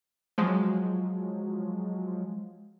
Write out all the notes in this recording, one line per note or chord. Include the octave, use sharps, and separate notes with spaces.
F3 F#3 G#3